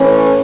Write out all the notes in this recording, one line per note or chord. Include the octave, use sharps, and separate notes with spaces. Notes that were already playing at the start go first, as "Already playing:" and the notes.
Already playing: A2 E3 C#4